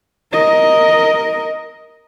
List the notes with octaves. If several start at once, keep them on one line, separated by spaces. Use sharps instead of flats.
A#4 D#5